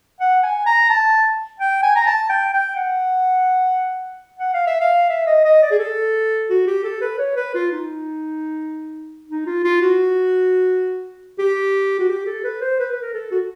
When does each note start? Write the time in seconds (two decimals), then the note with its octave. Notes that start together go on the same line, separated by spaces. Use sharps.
0.20 F#5
0.43 G#5
0.66 A#5
0.90 A5
1.60 G5
1.83 G#5
1.96 A#5
2.07 A5
2.30 G5
2.53 G5
2.76 F#5
4.39 F#5
4.54 F5
4.67 E5
4.81 F5
5.09 E5
5.27 D#5
5.45 D#5
5.62 D5
5.71 G#4
5.79 A4
6.50 F#4
6.67 G4
6.84 A4
7.01 B4
7.19 C#5
7.36 B4
7.55 F4
7.72 D#4
9.29 D#4
9.46 F4
9.64 F4
9.82 F#4
11.39 G4
11.99 F#4
12.09 G4
12.26 A4
12.44 B4
12.61 C5
12.79 B4
12.91 B4
13.02 A#4
13.14 A4
13.31 F#4